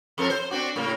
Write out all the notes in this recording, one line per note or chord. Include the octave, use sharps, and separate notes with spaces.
F2 A4 A#4
C5
C4 D4 F#4
A2 C#3 A#3